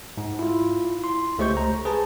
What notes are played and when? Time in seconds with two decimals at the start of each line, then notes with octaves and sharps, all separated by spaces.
0.17 G#2
0.39 E4 F4
1.04 C6
1.39 C#2 A3 G4 C5 C#6 G6
1.57 A#5
1.85 G#4 B4 A5